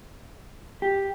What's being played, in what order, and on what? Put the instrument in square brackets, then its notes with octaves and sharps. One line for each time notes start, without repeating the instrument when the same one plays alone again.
[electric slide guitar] G4